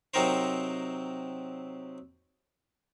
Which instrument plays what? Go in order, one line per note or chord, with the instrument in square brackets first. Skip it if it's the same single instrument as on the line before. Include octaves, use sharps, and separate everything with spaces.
[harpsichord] C3 F#3 C4 D#4 A#4 C5